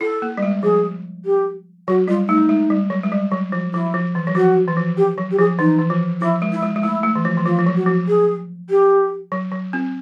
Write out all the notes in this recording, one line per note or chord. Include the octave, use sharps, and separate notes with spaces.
E4 A4
A#3
G3
G#3
F3 G#4
G4
F#3 F#4
G3 F4
A3 D#4
G#3
G3
F#3
G#3
G3
F#3
F3
F3 E4
F3
E3
F#3
F3 F#4
E3
F3
G4
F#3
G4
F3 G#4
E3 D#4
E3
F3
F3 E4
G#3
E4
G#3
G#3
A3 E4
A3
E3
F3
E3
F3 F4
F3
F#3
F#4
F3
G#4
G4
F#3
F#3
C4